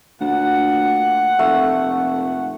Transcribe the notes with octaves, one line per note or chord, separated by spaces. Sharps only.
D2 A#2 F#5
F1 A3